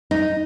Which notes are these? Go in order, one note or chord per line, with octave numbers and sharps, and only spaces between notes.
D#4